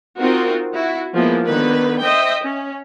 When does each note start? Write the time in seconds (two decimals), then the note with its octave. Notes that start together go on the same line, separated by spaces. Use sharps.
0.16 C4 D#4 F4 F#4 A#4
0.72 E4 F#4
1.14 F3 G#3 A#3 B3 E4
1.44 D3 D#3 B3 B4
2.01 C5 D#5 E5 G5
2.43 C#4